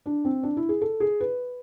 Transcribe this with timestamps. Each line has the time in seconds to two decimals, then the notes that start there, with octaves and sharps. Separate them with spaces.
0.06 D4
0.25 C4
0.43 D4
0.57 E4
0.69 G#4
0.81 A4
1.00 G#4
1.21 B4